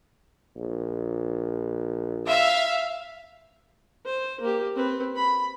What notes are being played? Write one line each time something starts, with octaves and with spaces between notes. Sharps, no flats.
A#1
E5 F5
C5
A#3 G4
C4 B4
B5